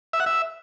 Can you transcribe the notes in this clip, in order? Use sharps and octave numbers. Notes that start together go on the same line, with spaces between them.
E5
F#5
E5